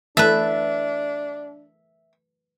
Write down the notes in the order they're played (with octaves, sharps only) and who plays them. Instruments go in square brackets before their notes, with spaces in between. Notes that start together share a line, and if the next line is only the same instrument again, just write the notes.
[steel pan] E3 A3 A4 [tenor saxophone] D4 [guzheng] B4 A5 [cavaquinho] E5